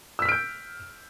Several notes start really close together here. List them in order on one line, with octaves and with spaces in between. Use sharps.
E6 B6 F6 D7 G6